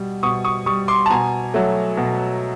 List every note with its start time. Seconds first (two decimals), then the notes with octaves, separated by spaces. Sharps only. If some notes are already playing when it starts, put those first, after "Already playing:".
Already playing: B2 G3
0.23 B2 C#6 D#6
0.44 C#6 D#6
0.66 G3 C#6 D#6
0.88 C6 D6
1.06 A5
1.10 B2 G#5 A#5
1.54 F#3 A3
1.97 B2